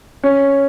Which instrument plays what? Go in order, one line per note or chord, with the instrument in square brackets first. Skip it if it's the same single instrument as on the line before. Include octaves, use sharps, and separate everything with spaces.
[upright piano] C#4